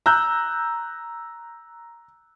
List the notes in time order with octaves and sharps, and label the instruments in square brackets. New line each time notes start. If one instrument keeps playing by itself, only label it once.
[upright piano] A#5 E6 F#6 G6